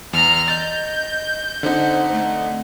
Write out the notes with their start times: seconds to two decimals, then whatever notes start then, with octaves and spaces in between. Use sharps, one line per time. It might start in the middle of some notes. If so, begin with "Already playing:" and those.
0.13 E2 A#5 F6
0.48 D#5 G6 A6
1.63 D3 C4 D#4 C5 F#5
2.12 A3